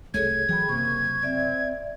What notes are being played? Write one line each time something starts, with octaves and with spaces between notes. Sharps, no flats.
F#1 C2 A3 G#4 A4 C#5 G#6
D1 E3 F#3 G#4 G5 B5
F#1 F#2 C3 A#3 C#6
C4 D5 E5